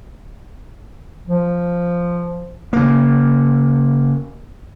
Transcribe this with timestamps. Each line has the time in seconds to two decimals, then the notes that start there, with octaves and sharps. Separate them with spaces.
1.27 F3
2.73 C#3 A#3